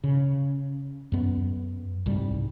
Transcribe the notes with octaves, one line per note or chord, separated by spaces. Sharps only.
C#3
F#2 B3
C2 G#2 G3